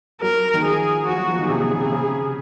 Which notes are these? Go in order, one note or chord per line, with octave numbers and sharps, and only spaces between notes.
F#3 A#4
D#3
F3 G#4
F3 F#4
F#3
F3
D#3
C3 G#4
C3
C#3
C3
C#3